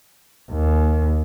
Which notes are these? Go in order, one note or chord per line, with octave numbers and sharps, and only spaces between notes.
D#2